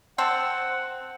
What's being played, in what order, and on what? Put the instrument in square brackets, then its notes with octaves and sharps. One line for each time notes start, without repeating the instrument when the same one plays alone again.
[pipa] C4 C5 A5 [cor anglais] F#5